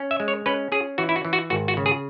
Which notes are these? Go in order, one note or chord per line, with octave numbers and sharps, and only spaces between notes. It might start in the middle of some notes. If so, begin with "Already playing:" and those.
Already playing: C#4
E5
G#3
C#5
C#4 B4
C#4 G#4
E3 F#4
E4
F#4
E3
F#4
G#1 F#4
F#4
C#3
G#4